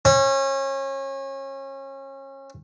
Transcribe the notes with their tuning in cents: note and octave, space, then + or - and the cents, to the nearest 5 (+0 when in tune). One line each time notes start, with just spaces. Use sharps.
C#4 -30